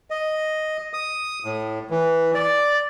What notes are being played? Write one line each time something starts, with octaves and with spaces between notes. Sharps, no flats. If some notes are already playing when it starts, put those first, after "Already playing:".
D#5
D#6
A2
E3
D5